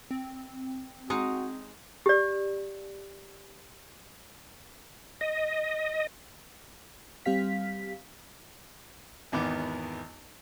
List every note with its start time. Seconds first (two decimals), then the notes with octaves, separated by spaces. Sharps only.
0.11 C4
1.10 G#3 D#4 F#4
2.06 G4 D5
5.21 D#5
7.26 G3 C4 G4 F5 B6
9.32 G#1 E2 D#3 B3 D6